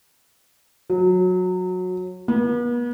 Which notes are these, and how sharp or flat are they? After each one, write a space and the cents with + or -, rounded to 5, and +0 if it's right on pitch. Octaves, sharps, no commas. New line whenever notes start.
F#3 -20
B3 -40